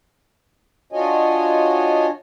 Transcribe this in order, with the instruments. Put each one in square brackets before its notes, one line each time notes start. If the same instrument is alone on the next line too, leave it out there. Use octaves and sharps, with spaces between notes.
[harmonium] D4 F4 F#4 C#5 D#5 G#5